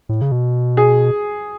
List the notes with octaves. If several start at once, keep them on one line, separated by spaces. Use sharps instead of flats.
A2
C#3
B2
G#4